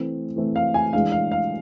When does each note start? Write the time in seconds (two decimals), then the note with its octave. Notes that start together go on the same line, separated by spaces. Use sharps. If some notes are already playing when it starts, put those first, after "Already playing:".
Already playing: E3 A3 C4
0.36 E3 A3 C4
0.56 F5
0.74 G#5
0.93 E3 G#3 D4 F5
1.12 F5
1.32 F5